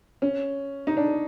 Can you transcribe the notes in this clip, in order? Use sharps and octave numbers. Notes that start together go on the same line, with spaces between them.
C#4
D#4
D4